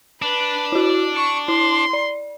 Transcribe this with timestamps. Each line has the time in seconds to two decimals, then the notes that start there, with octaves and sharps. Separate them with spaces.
0.22 D4 B4
0.72 E4 F#4
1.16 C#6 D7
1.48 E4 C6
1.93 D5